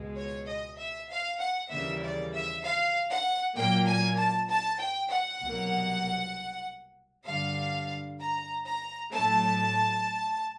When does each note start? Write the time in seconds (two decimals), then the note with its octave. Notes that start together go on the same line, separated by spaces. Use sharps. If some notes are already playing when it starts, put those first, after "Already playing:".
Already playing: C#2 B2 G#3
0.16 C#5
0.47 D#5
0.78 E5
1.09 F5
1.40 F#5
1.70 D#2 C#3 E3 G3 A#3 E5
2.02 D5
2.33 E5
2.63 F5
3.10 F#5
3.55 A#2 F#3 A#3 G5
3.87 G#5
4.17 A5
4.49 A5
4.79 G5
5.10 F#5
5.41 C2 B2 F#3 A#3
7.26 G2 D3 G3 F5
8.19 A#5
8.65 A#5
9.12 A2 F#3 A3 A5